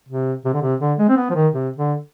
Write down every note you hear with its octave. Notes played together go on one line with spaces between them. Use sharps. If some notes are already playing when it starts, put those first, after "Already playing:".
C3
C3
D3
C3
D3
G#3
C4
B3
F3
D#3
C3
D3